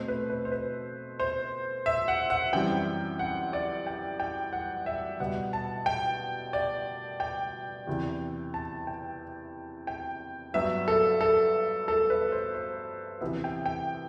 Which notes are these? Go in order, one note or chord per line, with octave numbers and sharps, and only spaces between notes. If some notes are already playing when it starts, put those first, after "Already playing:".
Already playing: B2 A3 C4 C5
B4
B4
C5
B4
C5
E5
F#5
F#5
F#2 E3 G3 C4 G5
F#5
D5
G5
G5
F#5
E5
B2 G3 B3 F#5
A5
G5
D5
G5
E2 C3 E3
A5
G5
G5
G2 F#3 B3 E5
A4
A4
A4
B4
C5
C5
C3 E3 B3 E5
G5
G5